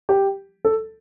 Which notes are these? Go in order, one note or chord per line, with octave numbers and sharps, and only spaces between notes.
G4
A4